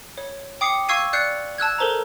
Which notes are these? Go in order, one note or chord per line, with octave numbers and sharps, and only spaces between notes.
C#5
G5 D6 D#6 C7 C#7
F5 C#6 E6 G#6 C7 D#7
D5 F#6 G6 C7 C#7
A5 E6 F#6 G#6
A4 A#4 C5 A5 A#5